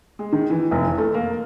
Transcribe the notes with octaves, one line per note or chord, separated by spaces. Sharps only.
G#3
D#3
E3
F1
E3
A3
A#3